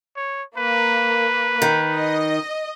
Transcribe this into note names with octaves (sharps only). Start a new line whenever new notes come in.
C#5
A#3 B4
D#3
D#5